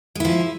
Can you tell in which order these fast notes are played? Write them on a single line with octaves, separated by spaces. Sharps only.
G#3 E4 F3